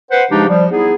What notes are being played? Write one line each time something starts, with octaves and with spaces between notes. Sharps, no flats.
B4 C5 F#5
C#3 F3 G#3 D4 D#4 G4
F3 G3
B3 D#4 E4 G#4